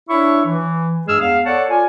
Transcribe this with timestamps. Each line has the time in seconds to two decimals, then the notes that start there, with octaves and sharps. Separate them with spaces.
0.10 D4 E4 C#5 C#6
0.46 E3
1.07 G2 G#3 G#4 E6 F6
1.21 E2 F5
1.46 A4 C#5 D5 F#5 A5
1.68 F4 D5 G#5